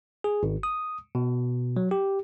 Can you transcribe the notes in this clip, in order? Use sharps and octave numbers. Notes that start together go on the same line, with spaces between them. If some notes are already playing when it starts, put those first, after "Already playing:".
G#4
G#1
D#6
B2
F#3
G4